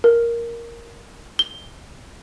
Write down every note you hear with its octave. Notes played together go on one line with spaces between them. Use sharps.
A#4
G7